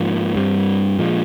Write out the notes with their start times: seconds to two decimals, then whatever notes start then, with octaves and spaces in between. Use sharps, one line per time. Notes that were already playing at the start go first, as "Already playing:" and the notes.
Already playing: G#2 F3 A#3
0.36 G2 G3 C4
0.98 A#2 F3 G#3